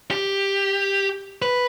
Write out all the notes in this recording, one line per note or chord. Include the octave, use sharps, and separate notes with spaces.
G4
B4